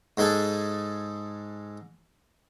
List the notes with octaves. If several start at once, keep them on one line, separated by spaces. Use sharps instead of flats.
G#2 G#3 D#4 G#4 A4